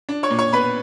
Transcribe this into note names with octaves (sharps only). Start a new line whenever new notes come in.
D4
C#5 C#6
A#2
C#5 C#6
B3 B4 B5